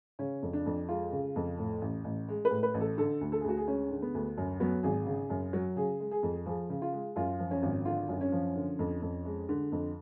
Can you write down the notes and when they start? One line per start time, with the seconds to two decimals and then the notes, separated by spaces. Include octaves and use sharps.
0.19 C#3 C#4
0.42 F2
0.53 D4
0.66 F2
0.89 G#3 F4
1.12 C#3
1.36 F2
1.58 A2
1.82 A1
2.04 A1
2.28 G#3
2.45 B4
2.51 A2
2.63 B4
2.74 A1
2.80 A4
2.98 D3 A4
3.21 D2
3.32 A4
3.41 G#4
3.44 D2 F#4
3.57 G#4
3.67 G#3 C#4
3.91 D3
4.02 B3
4.15 D2
4.38 F#2
4.60 F#3 B3
4.83 G#1 G#4
5.06 C#3
5.30 F#2
5.53 F#3
5.76 C#3 G#4
6.00 G#3
6.11 G#4
6.23 F2
6.46 F3 G#4
6.70 C#3
6.82 F4
6.93 G#3
7.16 F#2 F4
7.39 F3
7.51 C#4
7.62 G#1
7.85 D3 F4
8.09 F#2
8.21 C#4
8.32 F3
8.56 D3
8.79 F2
9.02 F2
9.25 G#3
9.49 D3
9.72 F2